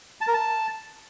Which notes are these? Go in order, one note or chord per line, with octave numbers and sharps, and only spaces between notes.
A5
A#4
A5